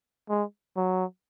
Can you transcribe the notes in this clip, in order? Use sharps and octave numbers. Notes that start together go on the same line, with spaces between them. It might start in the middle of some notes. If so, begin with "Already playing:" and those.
G#3
F#3